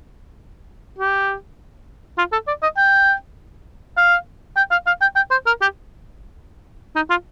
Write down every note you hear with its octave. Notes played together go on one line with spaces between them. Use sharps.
G4
F4
A4
D5
D#5
G5
F5
G5
F5
F5
G5
G5
C5
A#4
G4
D#4
F4